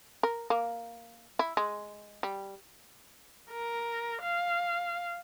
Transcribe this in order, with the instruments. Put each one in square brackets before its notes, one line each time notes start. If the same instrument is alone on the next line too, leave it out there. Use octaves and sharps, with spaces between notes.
[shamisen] A#4
A#3
E4
G#3
G3
[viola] A#4
F5